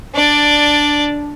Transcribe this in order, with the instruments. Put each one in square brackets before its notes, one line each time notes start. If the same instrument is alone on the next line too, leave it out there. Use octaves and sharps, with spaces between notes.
[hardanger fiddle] D4 D5